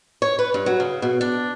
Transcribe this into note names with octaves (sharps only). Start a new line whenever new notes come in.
C#5
B4
G2
F#3
C#3
B2
D4